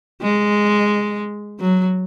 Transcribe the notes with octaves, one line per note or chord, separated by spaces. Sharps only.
G#3
F#3